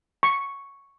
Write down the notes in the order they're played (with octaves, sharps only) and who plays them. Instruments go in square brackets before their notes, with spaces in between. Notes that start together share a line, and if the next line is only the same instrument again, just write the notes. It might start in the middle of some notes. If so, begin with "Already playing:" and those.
[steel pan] C#6